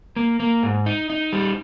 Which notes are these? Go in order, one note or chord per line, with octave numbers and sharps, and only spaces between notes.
A#3
A#3
G#2
D#4
D#4
G3